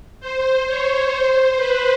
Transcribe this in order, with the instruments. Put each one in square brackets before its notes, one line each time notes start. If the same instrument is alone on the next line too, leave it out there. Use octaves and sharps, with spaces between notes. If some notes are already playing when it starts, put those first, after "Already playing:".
[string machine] C5
C#5
C5
B4